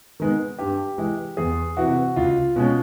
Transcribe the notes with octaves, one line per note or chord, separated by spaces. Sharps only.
D#3 G#3 B3
G2 G4
E3 G#3
E2 G#4
C3 E3 F#4
C#2 F4
B2 G#3 C#4